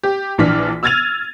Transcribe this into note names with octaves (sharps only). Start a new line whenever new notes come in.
G4
A#1 E3 D4 F6 B6
E6 F6 G#6 A6 D#7 F7